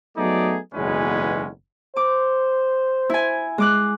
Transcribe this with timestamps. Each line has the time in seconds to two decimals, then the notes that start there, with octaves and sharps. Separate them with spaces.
0.17 F#3 A3 B3 D#4 G#4 D5
0.74 F#1 B1 E2 G#3 C#4 B4
1.96 C5 D6
3.10 E4 G#5
3.58 G#3 D6 F#6